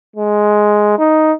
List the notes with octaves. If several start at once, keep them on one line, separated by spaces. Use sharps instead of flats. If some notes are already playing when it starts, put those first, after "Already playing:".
G#3
D#4